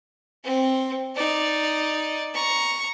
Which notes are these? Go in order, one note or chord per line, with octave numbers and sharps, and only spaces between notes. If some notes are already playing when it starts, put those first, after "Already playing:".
C4
D#4 D5
A#5 C#6